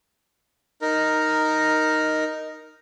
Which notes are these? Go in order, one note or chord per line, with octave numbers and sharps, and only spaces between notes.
D#4 A#4